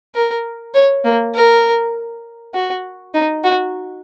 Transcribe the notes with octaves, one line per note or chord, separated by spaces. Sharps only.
A#4
C#5
A#3
A#4
F#4
D#4
F#4